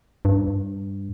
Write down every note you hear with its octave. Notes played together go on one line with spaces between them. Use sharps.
G2